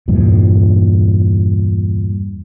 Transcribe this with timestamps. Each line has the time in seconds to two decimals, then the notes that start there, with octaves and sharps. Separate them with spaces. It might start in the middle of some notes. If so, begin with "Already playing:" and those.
0.08 E2 G2 A#2